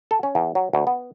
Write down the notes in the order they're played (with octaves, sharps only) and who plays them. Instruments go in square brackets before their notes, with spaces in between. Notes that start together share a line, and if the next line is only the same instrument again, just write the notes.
[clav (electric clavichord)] A4
C#4
E2
F#3
D2
B3